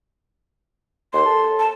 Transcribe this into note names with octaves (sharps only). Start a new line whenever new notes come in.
D#2 C6
A4
A5